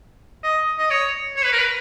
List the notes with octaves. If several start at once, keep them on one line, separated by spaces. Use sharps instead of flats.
D#5
D#5
C#5
C#5
B4
A#4
B4